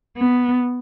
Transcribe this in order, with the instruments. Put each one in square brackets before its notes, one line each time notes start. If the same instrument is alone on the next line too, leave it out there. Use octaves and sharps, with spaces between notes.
[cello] B3